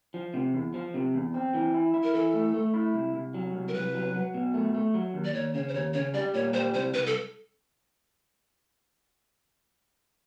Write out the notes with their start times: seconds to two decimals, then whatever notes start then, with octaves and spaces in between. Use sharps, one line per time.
0.14 F3
0.34 C3
0.54 E2
0.74 F3
0.94 C3
1.14 E2
1.34 C4
1.54 E3
1.74 E4
1.94 E4
2.04 A#4
2.14 E3 A4
2.34 A3
2.54 A3
2.74 E4
2.94 C2
3.14 C2
3.34 F#3
3.54 C2
3.68 A#4
3.74 C2 B4
3.94 F#3
4.14 F#3
4.34 B2
4.54 A3
4.74 A3
4.94 F#3
5.14 D#2
5.25 D5
5.34 D#2 C#5
5.54 C#3 C#5
5.68 C5
5.74 D#2 C#5
5.94 C#3 C#5
6.14 G3 D5
6.34 A#2 C#5
6.54 G3 C5
6.74 C2 C5
6.94 C2 B4
7.06 A4